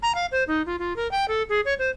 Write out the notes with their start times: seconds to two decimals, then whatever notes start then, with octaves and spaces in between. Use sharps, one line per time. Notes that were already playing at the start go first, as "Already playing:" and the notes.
0.02 A#5
0.15 F5
0.32 C5
0.47 D#4
0.66 F4
0.79 F4
0.96 A#4
1.11 G5
1.28 A4
1.49 G#4
1.65 C#5
1.79 C5